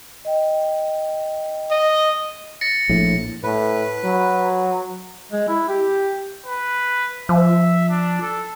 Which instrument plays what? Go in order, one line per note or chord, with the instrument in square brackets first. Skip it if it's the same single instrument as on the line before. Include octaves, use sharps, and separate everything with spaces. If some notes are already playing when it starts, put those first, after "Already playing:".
[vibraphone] D#5 G5
[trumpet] D#5
[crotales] A6 A#6 C#7
[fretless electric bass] A#1 A2
[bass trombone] A2 [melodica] B4
[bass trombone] F#3
[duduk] G#3
E4
G4
[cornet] B4
[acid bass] F3 [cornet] E5
[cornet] D4
A4